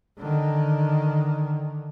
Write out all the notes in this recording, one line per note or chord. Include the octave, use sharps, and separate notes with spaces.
D3 D#3